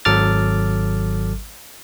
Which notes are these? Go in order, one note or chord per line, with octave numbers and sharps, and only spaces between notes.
G#1 F#3 A4 D6 F6 A6